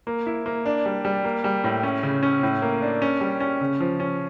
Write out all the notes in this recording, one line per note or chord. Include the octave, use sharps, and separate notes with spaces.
A#3
E4
A#3
D4
G3
G3
A#3
G3
A2
C#4
C#3
C#4
A2
A#3
D4
C#4
G3
C#4
C#3
F3
C#4